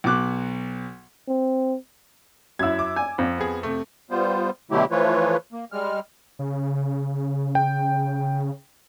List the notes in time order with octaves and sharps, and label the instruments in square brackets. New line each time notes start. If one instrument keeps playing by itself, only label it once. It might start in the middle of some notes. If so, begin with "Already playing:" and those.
[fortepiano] B1 B2 D6 F#6
[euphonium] C4
[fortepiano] F#2 E4 [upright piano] E6 G#6
[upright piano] D6
[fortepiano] G#5
F2
[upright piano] B3 G#4
C3 A3
[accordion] G3 B3 F4 C5
B2 D3 F#3 A3 E4 G4
E3 F3 A3 F4 B4 C#5
A#3
G3 G#3 F6
[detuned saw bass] C#3
[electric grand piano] G5